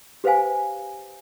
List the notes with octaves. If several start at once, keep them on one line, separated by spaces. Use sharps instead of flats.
G4 B4 C5 F5 G#5